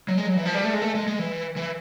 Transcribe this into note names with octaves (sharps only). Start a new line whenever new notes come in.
F#3
G#3
F#3
E3
F3
G3
A3
G#3
A3
G#3
G#3
E3
E3